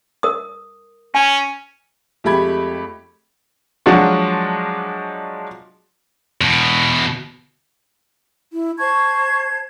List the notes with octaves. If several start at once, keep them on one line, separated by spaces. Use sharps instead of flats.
A#4 D#6
C#4 G#5
F2 G#3 A3 G4 B5 G#6
F3 F#3 G#3 D4 F4 F#4
E2 B2
E4
C5 A5 C#6 G#6